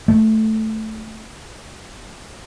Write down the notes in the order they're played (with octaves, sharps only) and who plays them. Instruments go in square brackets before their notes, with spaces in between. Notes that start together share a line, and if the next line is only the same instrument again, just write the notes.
[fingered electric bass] A3